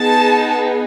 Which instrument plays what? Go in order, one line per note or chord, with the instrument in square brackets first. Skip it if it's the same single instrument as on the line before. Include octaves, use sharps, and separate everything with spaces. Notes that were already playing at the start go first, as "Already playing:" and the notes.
Already playing: [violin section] B3 D#4 G#4 A5